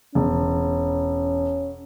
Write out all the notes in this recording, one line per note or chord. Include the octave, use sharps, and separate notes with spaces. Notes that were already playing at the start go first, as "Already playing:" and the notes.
E1 C#4